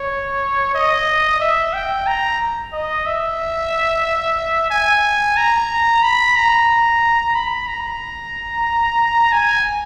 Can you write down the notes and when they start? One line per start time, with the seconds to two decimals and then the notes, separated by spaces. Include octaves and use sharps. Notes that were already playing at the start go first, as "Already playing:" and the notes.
Already playing: C#5
0.75 D#5
1.40 E5
1.73 G5
2.07 A#5
2.73 D#5
3.06 E5
4.70 G#5
5.37 A#5
6.03 B5
6.36 A#5
7.35 B5
7.67 A#5
9.32 G#5